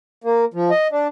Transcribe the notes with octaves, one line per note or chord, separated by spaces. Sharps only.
A#3
F3
D#5
D4